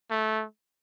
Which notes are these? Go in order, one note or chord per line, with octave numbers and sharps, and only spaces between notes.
A3